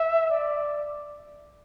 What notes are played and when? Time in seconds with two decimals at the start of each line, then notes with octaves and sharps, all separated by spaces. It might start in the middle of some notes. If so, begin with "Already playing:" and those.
Already playing: E5
0.30 D5